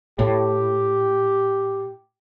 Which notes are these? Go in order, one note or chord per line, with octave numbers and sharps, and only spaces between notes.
A2 G4